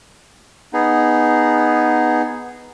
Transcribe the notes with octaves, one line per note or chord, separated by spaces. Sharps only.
B3 D#4 G#4